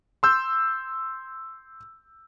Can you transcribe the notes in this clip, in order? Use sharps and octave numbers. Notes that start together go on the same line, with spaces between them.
C6 E6 G6